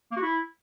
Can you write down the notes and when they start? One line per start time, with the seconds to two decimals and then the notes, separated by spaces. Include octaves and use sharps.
0.12 A#3
0.17 F#4
0.22 E4